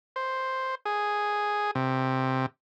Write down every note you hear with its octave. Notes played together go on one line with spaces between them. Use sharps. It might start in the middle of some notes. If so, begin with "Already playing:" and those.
C5
G#4
C3